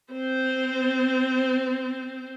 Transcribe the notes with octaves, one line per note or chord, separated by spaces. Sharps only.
C4 C5